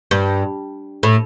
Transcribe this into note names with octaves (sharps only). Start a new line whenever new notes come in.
G2
A2